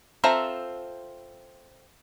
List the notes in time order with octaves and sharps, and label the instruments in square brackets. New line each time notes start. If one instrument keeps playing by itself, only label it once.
[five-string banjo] C4 F4 A4 E5 A#5